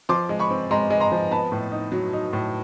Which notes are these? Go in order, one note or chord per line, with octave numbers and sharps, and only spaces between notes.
F3 C6 D6
G#3
B5 C#6
C4
G#3 A#5 C6
G#3
A#5 C6
F3
B3 A5 B5
A2
D#4
F#3
D#4
A2